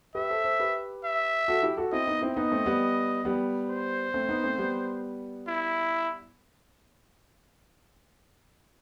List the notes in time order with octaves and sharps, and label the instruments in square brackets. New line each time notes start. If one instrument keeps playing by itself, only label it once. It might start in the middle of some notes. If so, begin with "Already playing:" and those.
[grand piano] G4 B4 [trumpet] E5
[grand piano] A4 C5
A4 C5
G4 B4
[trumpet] E5
[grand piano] F#4 A4
E4 G4
F#4 A4
[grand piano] C4 E4 [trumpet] D#5
[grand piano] B3 D#4
C4 E4
[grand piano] B3 D#4 [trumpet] D#5
[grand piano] A3 C4
G3 B3
G3 B3
[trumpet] C5
[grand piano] A3 C4
B3 D#4
A3 C4
G3 B3
[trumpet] E4